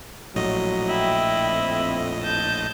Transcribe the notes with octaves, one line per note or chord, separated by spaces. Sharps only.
A#1 A2 F#3 D#5
E4 G5
F2 C4
A5 G6